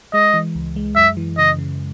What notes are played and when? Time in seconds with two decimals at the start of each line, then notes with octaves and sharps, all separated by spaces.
0.14 G#3 D#5
0.34 E3
0.55 C#2
0.76 G#3
0.96 F#2 E5
1.17 E3
1.38 C#3 D#5
1.59 C#3